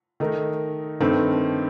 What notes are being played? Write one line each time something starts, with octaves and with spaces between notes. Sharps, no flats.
D#3 A3 D#4 A#4
G2 D#3 A3 C4